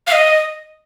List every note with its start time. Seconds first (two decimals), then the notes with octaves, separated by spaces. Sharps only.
0.07 F5
0.12 D#5